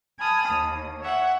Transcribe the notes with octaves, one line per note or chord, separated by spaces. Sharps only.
G#5 A5 B5 D#6 F6
D#2
C#5 E5 F#5